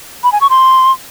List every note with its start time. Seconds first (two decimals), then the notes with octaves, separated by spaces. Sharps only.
0.24 B5
0.32 G#5
0.41 C#6
0.50 C6